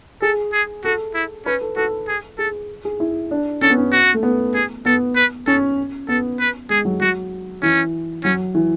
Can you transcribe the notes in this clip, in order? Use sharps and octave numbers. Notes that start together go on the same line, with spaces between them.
G#4 A4
G#4
F#4 A4
E4
C#4 B4
A4
F#4 A4
G#4
G#4 A4
G#4
E4
D4
C#4 A4
B3
C#4
F#4
A3
B3
G#4
B3 A4
B4
C#4 A4
B3 A4
B4
G#3 G#4
F#3
F#3 F#4
E3 C#4
F#3 C#4
E3